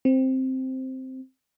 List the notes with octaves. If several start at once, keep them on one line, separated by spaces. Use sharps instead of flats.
C4